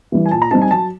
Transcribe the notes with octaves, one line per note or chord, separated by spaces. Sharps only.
E3 G3
G#5
A#2 A5
A#5
G3 C4 D#4 A5
G#5
F#3 A5